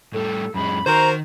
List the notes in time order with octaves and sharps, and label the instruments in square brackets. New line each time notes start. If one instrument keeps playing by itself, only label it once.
[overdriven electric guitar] A2 G3 [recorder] A4
[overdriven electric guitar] F#2 G#3 [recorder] B5
[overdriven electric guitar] D#3 [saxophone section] F#4 A#4 C5 [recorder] A#5